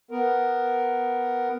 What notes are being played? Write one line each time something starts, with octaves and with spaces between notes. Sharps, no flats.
B3 A#4